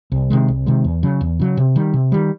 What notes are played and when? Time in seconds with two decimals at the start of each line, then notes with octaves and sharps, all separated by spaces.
0.12 C2
0.30 C3 D#3 G#3
0.48 C2
0.66 C3 D#3 G#3
0.84 E2
1.03 C#3 F#3
1.21 E2
1.40 C#3 F#3
1.57 C3
1.76 D#3 G3
1.94 C3
2.12 D#3 G3